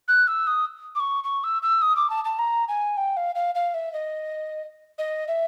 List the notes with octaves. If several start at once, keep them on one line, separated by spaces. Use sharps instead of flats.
F#6
E6
D#6
D6
C#6
C#6
E6
E6
D#6
D6
A5
A5
A#5
G#5
G5
F5
F5
F5
E5
D#5
D#5
E5